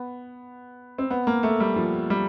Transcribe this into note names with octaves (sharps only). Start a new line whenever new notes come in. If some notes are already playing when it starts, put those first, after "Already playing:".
Already playing: B3
C4
B3
A#3
A3
G3
F3
G3